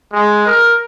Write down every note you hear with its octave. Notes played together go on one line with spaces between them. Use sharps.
G#3
A#4